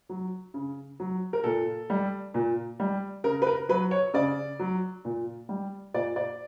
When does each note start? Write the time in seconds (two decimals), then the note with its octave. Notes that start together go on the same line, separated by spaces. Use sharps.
0.09 F#3
0.54 C#3
1.00 F#3
1.33 A#4
1.44 A#2 A4
1.90 G3
2.34 A#2
2.80 G3
3.24 C#3 A#4
3.42 B4
3.47 A#4
3.69 F#3 B4
3.91 C#5
4.14 C#3 D5
4.59 F#3
5.05 A#2
5.49 G3
5.94 A#2 D5
6.16 D5